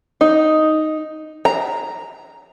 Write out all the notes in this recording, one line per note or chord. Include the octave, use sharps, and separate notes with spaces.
D#4
A#5